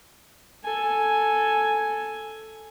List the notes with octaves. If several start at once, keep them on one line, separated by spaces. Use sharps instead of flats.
A4 G#5